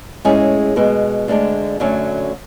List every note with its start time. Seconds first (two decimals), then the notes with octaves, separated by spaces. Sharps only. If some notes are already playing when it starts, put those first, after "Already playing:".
0.25 A2 G#3 C#4 E4 G#4
0.76 B2 G#3 B3
1.28 D2 D3 G#3 D4
1.80 F#2 D3 F#3 A3 C#4